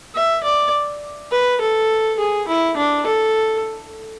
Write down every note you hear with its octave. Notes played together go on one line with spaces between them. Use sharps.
E5
D5
B4
A4
G#4
E4
D4
A4